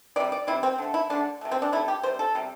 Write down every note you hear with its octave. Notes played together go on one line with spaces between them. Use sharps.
C3 G3 D5
D5
C3 G3 E4
C4
D3 A3
E4
D3 A3 D4
C3 A3
C4
D4
C3 A3 E4
G4
C3 G3 C5
A4
C3 G3